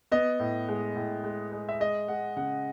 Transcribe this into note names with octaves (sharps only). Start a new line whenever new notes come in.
B3 D#5
A2
G#3
A2
G#3
G#3
E5
G#3 D#5
G#3 F#5
C#3 F#5